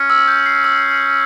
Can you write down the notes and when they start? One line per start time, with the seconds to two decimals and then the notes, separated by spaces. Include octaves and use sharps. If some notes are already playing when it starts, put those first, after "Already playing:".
Already playing: C#4
0.10 E6
0.28 G6
0.46 C7
0.64 E6